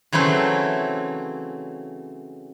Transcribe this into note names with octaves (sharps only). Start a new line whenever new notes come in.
C#3 E3 F#3 A3 C4